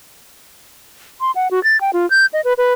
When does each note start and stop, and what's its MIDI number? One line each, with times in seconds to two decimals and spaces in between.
1.21 1.31 84
1.35 1.48 78
1.51 1.62 66
1.64 1.80 93
1.81 1.91 79
1.93 2.08 65
2.10 2.26 91
2.33 2.41 75
2.45 2.53 71
2.58 2.73 71